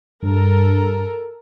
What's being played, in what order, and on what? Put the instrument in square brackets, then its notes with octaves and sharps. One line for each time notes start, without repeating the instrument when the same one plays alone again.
[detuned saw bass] G2 [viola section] A4 A#4